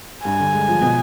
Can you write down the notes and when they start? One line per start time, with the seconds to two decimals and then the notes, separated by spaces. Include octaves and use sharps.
0.25 G2 G#5
0.40 D3
0.54 G#3
0.68 F3
0.81 B2